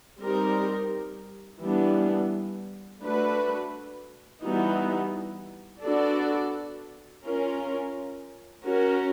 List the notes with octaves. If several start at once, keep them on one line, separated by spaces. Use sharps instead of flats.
G3 C4 D#4 G4 A#4
E3 G3 B3 D4
A3 D4 F#4 B4
E3 G3 B3 D#4 F#4
B3 D4 F#4 A4 D5
C#4 F4 A#4
C#4 F#4 A#4